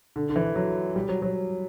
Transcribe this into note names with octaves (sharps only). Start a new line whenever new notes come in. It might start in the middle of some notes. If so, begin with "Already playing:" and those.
D3
D3
E3
F#3
G3
F#3
F#3